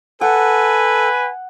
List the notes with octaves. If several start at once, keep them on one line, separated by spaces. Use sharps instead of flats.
A4 B4 F#5 G#5